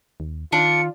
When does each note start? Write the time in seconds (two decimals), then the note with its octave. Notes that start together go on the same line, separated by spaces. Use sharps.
0.20 D#2
0.52 D#3 D4 F4 C#7